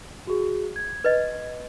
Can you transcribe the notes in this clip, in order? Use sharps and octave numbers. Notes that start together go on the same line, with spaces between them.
F#4 G#4
G#6
B4 D#5